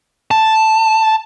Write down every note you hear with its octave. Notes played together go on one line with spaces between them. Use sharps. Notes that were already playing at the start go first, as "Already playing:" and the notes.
A5